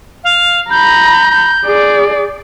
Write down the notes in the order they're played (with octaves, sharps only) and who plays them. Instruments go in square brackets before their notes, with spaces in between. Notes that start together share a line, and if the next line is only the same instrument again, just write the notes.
[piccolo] F5
[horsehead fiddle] A#5 B5 [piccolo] G6
[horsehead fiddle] G#4 D5